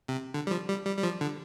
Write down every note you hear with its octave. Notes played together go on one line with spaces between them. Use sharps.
C3
D3
G3
F3
G3
G3
G3
F3
D3